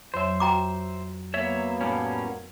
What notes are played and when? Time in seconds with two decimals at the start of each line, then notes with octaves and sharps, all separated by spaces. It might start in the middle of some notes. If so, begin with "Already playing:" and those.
0.14 F2 F#3 C5 C#5 E5
0.40 F#4 G5 A#5 D6
1.34 F#3 A#3 B3 C#5 E5
1.81 A2 G3 C#4